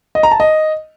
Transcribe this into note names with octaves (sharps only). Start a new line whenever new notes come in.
D#5
A#5
A5
D#5